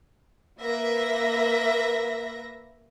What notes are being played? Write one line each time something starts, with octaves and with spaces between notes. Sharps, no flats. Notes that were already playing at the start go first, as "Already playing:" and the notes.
A#3 B4 E5 A#6